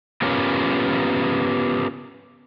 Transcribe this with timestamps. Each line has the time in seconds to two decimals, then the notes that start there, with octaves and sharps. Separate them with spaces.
0.22 B3 C#4 F4 G4 A#4 C#5